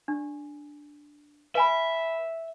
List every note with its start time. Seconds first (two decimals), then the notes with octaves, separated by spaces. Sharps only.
0.08 D4
1.55 B4 E5 G#5 B5